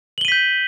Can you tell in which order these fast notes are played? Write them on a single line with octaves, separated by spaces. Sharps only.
F#7 G7 D#7 B6 G6